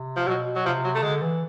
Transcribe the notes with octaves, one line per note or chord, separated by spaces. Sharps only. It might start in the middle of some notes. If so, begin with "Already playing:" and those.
Already playing: C3
F3
B2 F#3
F#3
C3 F3
F#3
A3
D3 G#3
E3